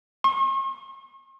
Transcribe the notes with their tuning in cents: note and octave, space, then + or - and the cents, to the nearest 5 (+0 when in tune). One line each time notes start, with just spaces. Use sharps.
C#6 -45